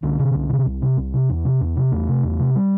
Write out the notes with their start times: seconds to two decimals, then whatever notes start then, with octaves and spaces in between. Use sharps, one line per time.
0.03 C2 D3
0.19 C3
0.35 C2
0.50 C3
0.66 C2
0.82 C3
0.97 C2
1.14 C3
1.30 E2
1.45 C3
1.61 E2
1.76 C3
1.92 E2 A3
2.08 C3
2.23 E2
2.39 C3
2.56 G3